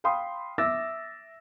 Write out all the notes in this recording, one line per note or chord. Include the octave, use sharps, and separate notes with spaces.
F5 G5 B5 C6 D#6
E5 D6 E6 A6 A#6